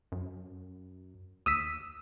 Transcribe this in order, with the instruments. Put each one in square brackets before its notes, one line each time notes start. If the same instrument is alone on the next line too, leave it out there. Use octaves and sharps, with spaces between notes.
[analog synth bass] F#2
[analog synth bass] D#2 [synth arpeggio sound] D#6 E6 B6